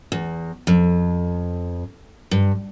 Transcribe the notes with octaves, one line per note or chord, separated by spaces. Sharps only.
E2
F2
G2